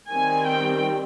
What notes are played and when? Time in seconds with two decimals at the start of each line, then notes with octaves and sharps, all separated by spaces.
0.11 D#3 G3 C4 G#5
0.48 G5